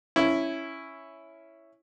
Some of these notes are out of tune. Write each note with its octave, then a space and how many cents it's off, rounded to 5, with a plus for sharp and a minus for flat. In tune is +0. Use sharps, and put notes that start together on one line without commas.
C#4 +0 E4 +0